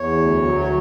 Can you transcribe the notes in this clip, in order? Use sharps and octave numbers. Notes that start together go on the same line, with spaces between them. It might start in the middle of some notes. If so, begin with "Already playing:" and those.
Already playing: E2 C#5
D2
F#3
C#5